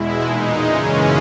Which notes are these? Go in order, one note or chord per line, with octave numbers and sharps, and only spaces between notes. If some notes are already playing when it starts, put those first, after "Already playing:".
Already playing: E2 B2 G#3 E4
A#2 G#3 D#4
F#2 C#3 E3 G#3 C#4